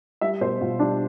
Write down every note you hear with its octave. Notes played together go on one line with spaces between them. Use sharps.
G3 E5
B2 C5
B2 F4
G3 D4